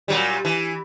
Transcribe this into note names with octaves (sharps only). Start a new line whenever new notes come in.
A#2 F#3 G3
E3